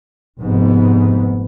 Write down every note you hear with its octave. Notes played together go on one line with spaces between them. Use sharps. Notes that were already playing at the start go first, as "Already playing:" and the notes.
F1 G#2 B3